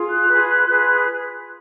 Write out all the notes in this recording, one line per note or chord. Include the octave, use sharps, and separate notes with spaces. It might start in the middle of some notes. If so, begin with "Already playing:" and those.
Already playing: F4 G#4
F#6
F4 G#4 B4
F4 G#4 B4